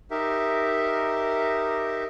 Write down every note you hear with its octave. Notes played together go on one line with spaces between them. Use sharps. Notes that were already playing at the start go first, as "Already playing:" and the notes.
D#4 G4 A#4 E5